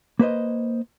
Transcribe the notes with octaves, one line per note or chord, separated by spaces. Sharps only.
A#3 B4 C5 D#5